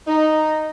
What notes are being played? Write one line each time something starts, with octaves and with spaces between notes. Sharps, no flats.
D#4